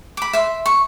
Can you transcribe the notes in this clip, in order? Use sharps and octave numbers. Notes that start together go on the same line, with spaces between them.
B5 D6
E5 C6
C#6